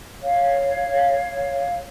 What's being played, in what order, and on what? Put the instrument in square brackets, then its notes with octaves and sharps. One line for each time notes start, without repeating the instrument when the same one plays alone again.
[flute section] C#5 F5